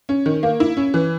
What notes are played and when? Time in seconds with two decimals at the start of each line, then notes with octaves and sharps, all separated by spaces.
0.09 C#4
0.26 D#3
0.43 A#3
0.60 E4
0.77 C#4
0.94 E3